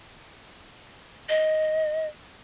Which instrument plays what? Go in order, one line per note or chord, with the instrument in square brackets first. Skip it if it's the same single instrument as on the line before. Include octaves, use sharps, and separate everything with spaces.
[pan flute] D#5